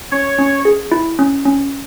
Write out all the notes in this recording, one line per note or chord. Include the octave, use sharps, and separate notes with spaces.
C#4 C#5
C#4
G#4
E4
C#4
C#4